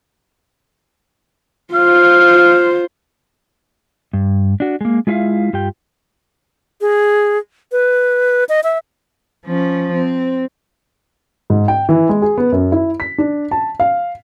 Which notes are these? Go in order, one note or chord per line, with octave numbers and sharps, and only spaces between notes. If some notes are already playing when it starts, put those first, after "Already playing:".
F4 C5 F5
G2
D4 F#4
G#3 A#3
G#3 E4 F4 B4 E5 F5
G2 F4 G4 G5
G#4
B4
D#5
E5
F3 C#4
C4
G#2
G5
E3
G#3
G#4
B3
F#2
E4
B6
D4
A5
F5